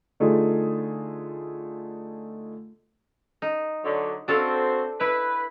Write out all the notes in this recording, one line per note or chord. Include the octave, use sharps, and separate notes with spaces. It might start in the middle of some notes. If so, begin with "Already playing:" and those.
D3 A3 D#4 F4 G#4
D#4
D3 F#3
C4 D4 F#4 A4 C5 F5
E4 B4